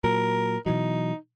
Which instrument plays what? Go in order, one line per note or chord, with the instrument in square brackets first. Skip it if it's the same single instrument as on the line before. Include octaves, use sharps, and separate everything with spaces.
[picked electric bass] A#2 F#3 [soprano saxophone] A#4
[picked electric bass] B2 E3 F#3 [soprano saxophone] D#4